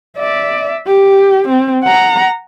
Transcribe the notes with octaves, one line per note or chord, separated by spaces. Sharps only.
D5 E5
G4
C4
F#5 A#5